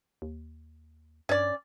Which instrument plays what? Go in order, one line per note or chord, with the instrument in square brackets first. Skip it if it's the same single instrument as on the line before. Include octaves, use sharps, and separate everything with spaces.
[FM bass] D#2
[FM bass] G2 [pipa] C#4 D5